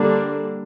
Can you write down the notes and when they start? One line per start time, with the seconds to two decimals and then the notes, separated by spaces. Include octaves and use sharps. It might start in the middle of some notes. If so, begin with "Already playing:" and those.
Already playing: D3 G3 A#3 D4